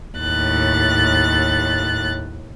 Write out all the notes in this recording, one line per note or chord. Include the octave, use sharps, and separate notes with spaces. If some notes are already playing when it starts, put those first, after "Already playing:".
D#2 A2 F#6 A6